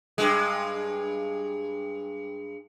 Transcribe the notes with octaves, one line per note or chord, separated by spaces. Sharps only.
G2 G#3